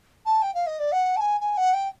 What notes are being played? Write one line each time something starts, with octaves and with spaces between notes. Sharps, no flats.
A5
G5
F5
D#5
D5
F#5
A5
G#5
G#5
F#5
G5